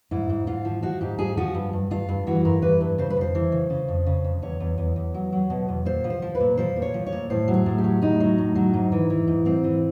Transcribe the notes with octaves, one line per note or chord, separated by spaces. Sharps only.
G#2 E4
G#2
G#2 F4
F3
F3 F#4
G#2 G4
F3 G#4
F3 F#4
G2
G2
G2 F4
G2
E3 F#4
G2 A#4
E3 B4
G2
C#3 C5
B4
F2 C5
E3
C#3
C#3
F2
C#3
F2
E2 C#5
E2
E2
E2
F#3
F#3
B2
E2
A#2 C5
F3
C5
F3
B4
A#2
F3 C5
A#2
C#5
F3
C#5
A#2
A2 C5
F#3
G#4
A2
G4
F#3
A2 D#4
F#3
A2
F#3
G#2
E3
E3
G#2
G#2 C4
E3